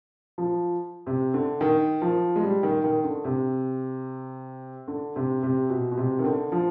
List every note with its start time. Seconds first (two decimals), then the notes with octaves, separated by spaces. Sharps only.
0.38 F3
1.07 C3
1.34 D3
1.61 D#3
2.02 F3
2.36 G#3
2.42 G3
2.63 D#3
2.84 D#3
3.04 D3
3.24 C3
4.87 D3
5.16 C3
5.43 C3
5.69 B2
5.91 B2
5.97 C3
6.19 D#3
6.24 D3
6.52 F3